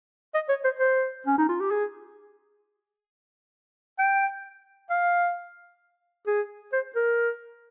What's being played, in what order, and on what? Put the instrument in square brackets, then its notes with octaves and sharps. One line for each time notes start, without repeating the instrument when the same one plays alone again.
[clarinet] D#5
C#5
C5
C5
C#4
D#4
F4
G4
G#4
G5
F5
G#4
C5
A#4